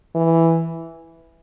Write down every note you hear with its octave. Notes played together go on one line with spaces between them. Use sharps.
E3